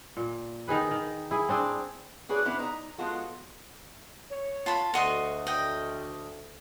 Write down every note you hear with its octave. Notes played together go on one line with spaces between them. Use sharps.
A#2
D#3 D#4 G#4 B4
D#3
E4 G#4
C4 D4 G#4
D4 F#4 G#4 B4 C#5 D5
B3 D4 E4 B4 C5
D#4 A#5
F3 G#3 B3 F4 F#4 A4
C#5
F4 A5 B5
D2 F#4 D#5 C6
D#5 G5